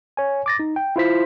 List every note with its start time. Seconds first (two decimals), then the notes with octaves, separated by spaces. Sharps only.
0.17 C#5 G#5
0.46 D6 A6 A#6
0.59 D#4
0.76 G5
0.96 E4 F4 C5 B6